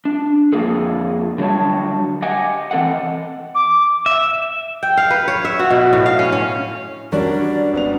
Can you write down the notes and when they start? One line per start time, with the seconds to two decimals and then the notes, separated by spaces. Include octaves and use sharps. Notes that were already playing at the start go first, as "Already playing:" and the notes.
0.05 D4
0.53 F2 C3 A#3 F4 G#4 A4
1.38 D3 F#3 G3 C#5 A5
2.22 G4 D#5 F#5 G#5
2.71 E3 C4 A4 D#5 F#5
3.55 D6
4.06 E5
4.83 G5
4.97 F5
5.10 B4
5.28 C#5
5.45 E5
5.59 F#4
5.70 B2
5.93 A2
6.06 F5
6.19 C#4
6.32 C#4
7.12 F#3 G3 C#4 D4 A#4 C#5 D5
7.73 G#1 B3 F7